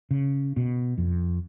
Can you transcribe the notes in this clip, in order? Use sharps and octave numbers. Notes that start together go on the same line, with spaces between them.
C#3
B2
F2